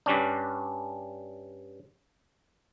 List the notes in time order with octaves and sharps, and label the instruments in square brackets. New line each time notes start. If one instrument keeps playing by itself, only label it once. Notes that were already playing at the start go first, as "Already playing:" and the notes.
[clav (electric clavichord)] G2 G3 C#4 D4